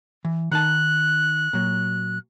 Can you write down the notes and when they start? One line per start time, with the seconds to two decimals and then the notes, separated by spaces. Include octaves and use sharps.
0.25 E3
0.51 D#3 D#4 A5 F#6
1.53 A#2 F#3